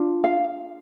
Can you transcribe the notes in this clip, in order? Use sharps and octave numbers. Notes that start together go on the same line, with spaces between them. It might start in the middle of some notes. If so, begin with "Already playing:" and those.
Already playing: D4 F4
F5